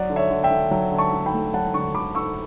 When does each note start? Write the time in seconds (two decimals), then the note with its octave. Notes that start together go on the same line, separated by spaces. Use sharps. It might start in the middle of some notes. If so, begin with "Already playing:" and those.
Already playing: F#3 D5 F#5
0.10 D3
0.16 C#5 E5
0.30 D3
0.44 E5 G5
0.51 D3
0.71 F#3
0.92 D3
0.98 A5 C#6
1.13 D3
1.26 G5 B5
1.33 A3
1.54 F#3 F#5 A5
1.74 D3 A5 C#6
1.95 D3 B5 D6
2.15 D3 C#6 E6